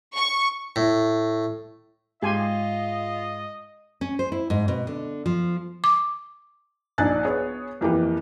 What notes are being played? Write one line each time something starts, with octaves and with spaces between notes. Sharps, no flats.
C#6
A2
G#2 G#3 F4 G4 D#5 G#5 C6
C#4
C5
E4
G#2
B2
D3
F3
D6
A#1 D4 D#4 G#5 F#6 A6
B3 G#4 C#5
F2 E3 A#3 G4 B4